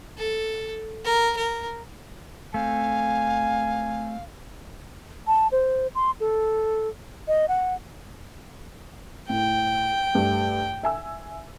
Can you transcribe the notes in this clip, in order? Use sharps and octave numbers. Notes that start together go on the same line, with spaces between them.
A4
A#4
A#4
A3 C4 F5 G#5
A5
C5
C6
A4
D#5
F#5
A2 G5
G2 G3 A3
E5 G#5 E6